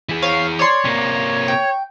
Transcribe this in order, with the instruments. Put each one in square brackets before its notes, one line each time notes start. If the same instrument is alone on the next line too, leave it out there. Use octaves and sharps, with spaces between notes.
[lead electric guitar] E3 G#4
[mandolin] C#5 [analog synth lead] F5
[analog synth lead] C#5 [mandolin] D5 C6
[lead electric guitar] C3 A#3
[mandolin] G5